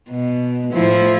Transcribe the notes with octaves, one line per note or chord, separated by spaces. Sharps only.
B2
A2 F3 E4